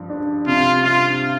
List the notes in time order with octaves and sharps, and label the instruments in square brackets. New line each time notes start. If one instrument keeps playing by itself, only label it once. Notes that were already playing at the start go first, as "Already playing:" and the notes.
Already playing: [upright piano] G2 F3
D4
[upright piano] C3 [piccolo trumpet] F4
[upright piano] C3 [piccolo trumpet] F4